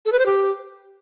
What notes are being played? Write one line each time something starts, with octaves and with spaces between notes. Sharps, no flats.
A4
B4
C5
G4